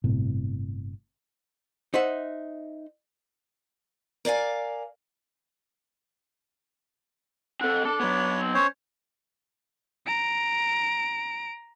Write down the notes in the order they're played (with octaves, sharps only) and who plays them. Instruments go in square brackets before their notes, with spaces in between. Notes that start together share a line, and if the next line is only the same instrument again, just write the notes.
[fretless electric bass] G1 A2 C3
[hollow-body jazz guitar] D#4 C5 E5 F#5
[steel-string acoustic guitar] A#4 D5 F5 G#5
[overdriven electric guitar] C4 A4 [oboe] F#5
[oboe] D4 [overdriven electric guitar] A4 A5
[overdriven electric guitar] F#3 B3 [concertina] B4 C#5
[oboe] C4
[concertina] C#4 C5 C#5
[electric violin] A#5 D7